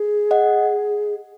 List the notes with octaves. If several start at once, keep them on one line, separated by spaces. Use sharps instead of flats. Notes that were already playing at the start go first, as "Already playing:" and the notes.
Already playing: G#4
D#5 F#5